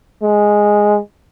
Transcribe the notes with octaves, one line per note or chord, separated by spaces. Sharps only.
G#3